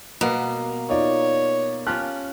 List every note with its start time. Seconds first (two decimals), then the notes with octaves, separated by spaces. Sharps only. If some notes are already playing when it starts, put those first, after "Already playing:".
0.21 B2 G3 A#3 B3
0.89 D#4 F4 C#5 D5
1.87 C#4 F4 G4 A5 F6 F#6